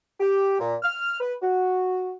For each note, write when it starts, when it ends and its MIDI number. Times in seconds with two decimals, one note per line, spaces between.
0.20 0.57 67
0.60 0.75 46
0.83 1.18 89
1.20 1.34 71
1.42 2.13 66